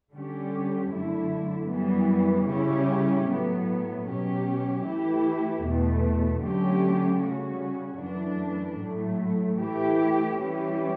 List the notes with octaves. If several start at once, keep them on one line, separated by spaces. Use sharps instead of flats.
D3 G3 C#4 G4
F#2 D3 A3 E4
F#2 E3 G3 B3
C#3 G3 C#4 E4 G4
A2 F#3 B3
B2 F#3 C#4 G4
E3 A3 E4 G4
E2 B2 A3
D3 F#3 A3 C#4 G4
C#3 G3 C#4 F#4
F#2 E3 A3 D4
A2 F#3 A3
E3 A3 E4 G4
E3 G3 C#4 E4 G4